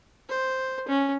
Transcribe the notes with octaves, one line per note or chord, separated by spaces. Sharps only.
C5
C#4